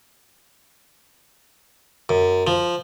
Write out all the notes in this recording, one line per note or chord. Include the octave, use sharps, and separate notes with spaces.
F#2
F3